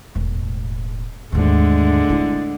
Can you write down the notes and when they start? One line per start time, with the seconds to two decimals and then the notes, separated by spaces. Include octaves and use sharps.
0.15 E1 A2
1.32 D#2 G#2 D3 G#3 A3
2.09 C4 E4